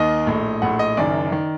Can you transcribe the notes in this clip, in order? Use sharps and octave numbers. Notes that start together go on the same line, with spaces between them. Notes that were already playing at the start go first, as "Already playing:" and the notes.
Already playing: D#2 D#3 D#5
A#1 A2
A#1 A2 F#5
D#5
F#1 F#2 D#3 D5
D#3